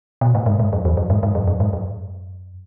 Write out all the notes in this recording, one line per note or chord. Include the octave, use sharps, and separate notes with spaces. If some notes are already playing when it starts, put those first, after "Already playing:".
B2
A2
G#2
G#2
F#2
E2
F#2
G#2
G#2
F#2
F#2
G#2
F#2